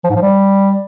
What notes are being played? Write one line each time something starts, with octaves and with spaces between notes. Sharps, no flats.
F3
G#2
F3
G3